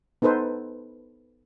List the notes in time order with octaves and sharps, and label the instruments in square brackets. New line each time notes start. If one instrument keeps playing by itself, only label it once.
[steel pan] B3 D#4 A4 B4 C5